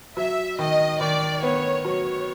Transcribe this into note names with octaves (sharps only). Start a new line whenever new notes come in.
F#3 E5
D#3 D#5
D#3 D5
B3 C#5
F#3 C#5